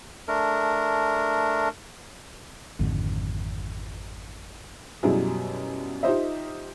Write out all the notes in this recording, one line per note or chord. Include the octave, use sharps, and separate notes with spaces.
A3 D4 A#4
G#1 F2 D3
F#2 B2 F#3 G3 E4 G#4
D#4 F4 G4 C5 D#5 E5